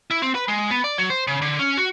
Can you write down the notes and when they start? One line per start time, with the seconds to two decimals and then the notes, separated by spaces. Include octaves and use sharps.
0.11 E4
0.22 C4
0.35 B4
0.48 G#3
0.70 B3
0.84 D5
0.98 F#3
1.10 C5
1.27 C#3
1.42 D3
1.59 C#4
1.77 F#4